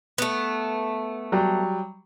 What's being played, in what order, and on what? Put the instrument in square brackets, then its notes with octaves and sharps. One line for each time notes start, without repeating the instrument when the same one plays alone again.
[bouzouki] A3 B3
[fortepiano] F#3 G3